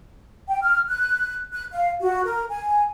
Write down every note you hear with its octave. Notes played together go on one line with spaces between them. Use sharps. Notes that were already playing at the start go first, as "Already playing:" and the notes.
G5
F6
F#6
F#6
F5
F#4
A#4
G#5